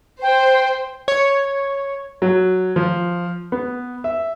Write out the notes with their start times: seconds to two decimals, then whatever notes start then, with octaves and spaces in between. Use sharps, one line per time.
0.22 C5 G5
1.08 C#5
2.22 F#3
2.76 F3
3.52 B3
4.04 E5